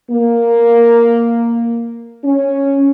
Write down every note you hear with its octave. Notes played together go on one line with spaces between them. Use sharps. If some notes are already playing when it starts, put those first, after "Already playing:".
A#3
C#4